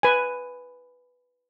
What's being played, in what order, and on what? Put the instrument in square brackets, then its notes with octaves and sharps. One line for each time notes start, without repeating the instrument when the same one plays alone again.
[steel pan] B4 G#5